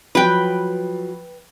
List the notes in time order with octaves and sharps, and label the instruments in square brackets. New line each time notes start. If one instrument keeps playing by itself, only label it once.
[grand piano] F3 F#3 [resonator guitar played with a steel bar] B4 G5